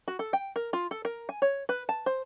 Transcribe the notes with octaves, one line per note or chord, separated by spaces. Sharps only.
F#4
A4
G5
A#4
F4
A4
A#4
G#5
C#5
B4
A5
C5